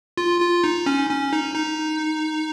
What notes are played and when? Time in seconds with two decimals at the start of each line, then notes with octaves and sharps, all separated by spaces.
0.17 F4
0.40 F4
0.64 D#4
0.86 C#4
1.10 C#4
1.33 D#4
1.55 D#4